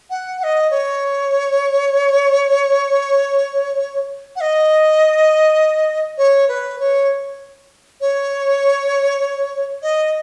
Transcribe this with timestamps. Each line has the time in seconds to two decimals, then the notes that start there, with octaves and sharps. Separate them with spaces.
0.10 F#5
0.40 F#5
0.43 D#5
0.70 C#5
4.36 F#5
4.41 D#5
6.17 C#5
6.48 B4
6.79 C#5
8.00 C#5
9.82 D#5